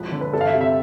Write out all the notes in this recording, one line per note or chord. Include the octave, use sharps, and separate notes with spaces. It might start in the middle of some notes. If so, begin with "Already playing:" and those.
Already playing: E1 F3 B4
D3
B4
G1 A4
F5
E5
C3
E5